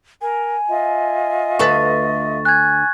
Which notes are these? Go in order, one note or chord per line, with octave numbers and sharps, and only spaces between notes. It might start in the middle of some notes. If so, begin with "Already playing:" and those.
A#4 G#5
F4 D#5 E5
D2 A4 B4 C#6 A6
G#5 F#6 G#6